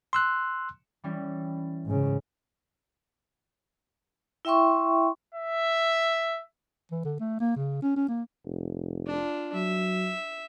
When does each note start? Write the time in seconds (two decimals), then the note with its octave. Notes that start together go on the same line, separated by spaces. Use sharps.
0.13 C6 E6 F#6
1.04 E3 G3 C#4
1.85 G#2 C#3
4.45 E4 E5 G5 C6 C#6
5.35 E5
6.91 E3
7.05 D3
7.20 A3
7.40 A#3
7.56 C#3
7.82 C#4
7.96 C#4
8.08 A#3
8.45 F1
9.07 D4 F4
9.54 F#3 E5